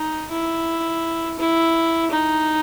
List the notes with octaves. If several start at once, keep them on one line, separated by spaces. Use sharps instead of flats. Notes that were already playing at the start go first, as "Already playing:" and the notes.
Already playing: D#4
E4
E4
D#4